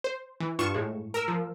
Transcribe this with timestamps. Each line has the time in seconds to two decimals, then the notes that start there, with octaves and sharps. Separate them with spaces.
0.04 C5
0.40 E3
0.59 G2 F4 C#6 E7
0.74 A2 G#3
1.14 A#4 E6
1.28 F3